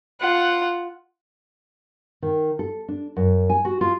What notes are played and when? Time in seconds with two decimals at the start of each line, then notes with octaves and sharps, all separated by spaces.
0.21 F4 F#5
2.22 D#3
2.59 A4
2.88 D4
3.16 F#2
3.50 G#5
3.65 F#4
3.81 F4